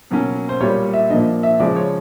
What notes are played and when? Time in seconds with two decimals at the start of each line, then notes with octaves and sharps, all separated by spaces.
0.11 B2 F#3 A#3 C#4
0.49 C5
0.60 A#2 G3 A#3 C#5
0.93 E5
1.10 A#2 F3 A#3 D4 D#5
1.43 E5
1.60 C#3 F3 G#3 D5
1.76 C#5